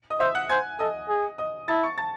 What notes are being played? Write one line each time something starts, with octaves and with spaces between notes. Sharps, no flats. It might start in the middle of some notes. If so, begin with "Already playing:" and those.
D#5 D#6
C5 E5 E6
F#5 F#6
C5 G#5 G#6
A4 D#5 D#6
G#4
D#5 D#6
E4 A5 A6
C#6 C#7
A5 A6